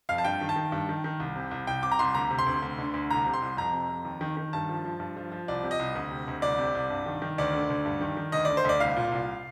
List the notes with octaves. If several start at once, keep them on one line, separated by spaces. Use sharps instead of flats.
F2 F5
A5
G2 G5
D#3
A5
D#3
G2
D#3
D#3
C2
C3
C2
C2 G5
C3 D6
A#5
C2 C6
D2 A#5
C3
C6
D2
D2
D3
D2
C2 A#5
C3
C6
C2
F2 A#5
C3
F2
D#2
D#3
D#3
G2 A5
F3
F3
G2
F3
F3
C2 D5
C3
D#5
C2
D2
C3
D2
C2 D5
C3
C2
G2
D#3
D#3
D2 D5
D3
D2
G2
D#3
D#3
D2 D#5
D3 D5
C5
D2 D5
C2 F5
A#2
C2